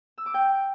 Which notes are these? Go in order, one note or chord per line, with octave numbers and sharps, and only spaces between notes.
E6
D6
G5